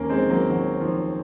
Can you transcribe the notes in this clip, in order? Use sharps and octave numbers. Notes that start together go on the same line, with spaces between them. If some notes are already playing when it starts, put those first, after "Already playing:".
Already playing: D#2 A#3 C#4
G#3 C4
D#3
F#3 A#3
D#3 F#3
D#3 F3